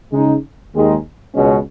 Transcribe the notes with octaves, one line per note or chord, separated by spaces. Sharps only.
C#3 G#3 D#4
D#2 D#3 G#3 D#4
C#2 B2 G#3 C#4